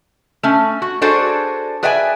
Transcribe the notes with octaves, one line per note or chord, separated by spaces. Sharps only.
A3 C#4
F#4
D4 F#4 G#4 A4 C5 D5
G#4 B4 D5 E5 G5 G#5